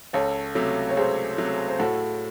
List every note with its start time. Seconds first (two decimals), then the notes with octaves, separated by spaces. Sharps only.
0.13 C#2 A4 C#5
0.55 C3 F#3 A3
0.89 C#5
0.97 C#2 G#4 C5
1.38 C3 F#3 A3
1.68 C5
1.79 A2 F#4 A4